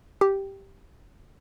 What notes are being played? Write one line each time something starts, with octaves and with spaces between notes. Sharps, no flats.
G4